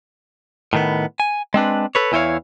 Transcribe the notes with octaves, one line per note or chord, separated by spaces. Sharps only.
A2 D#3 B3
G#5
G#3 C4 D4 B4
A4 B4 C#5
E2 E3 E4 C5 C#5 F5